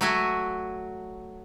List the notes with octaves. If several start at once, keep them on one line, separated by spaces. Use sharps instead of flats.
F#3 A3 F#4 E5 G#5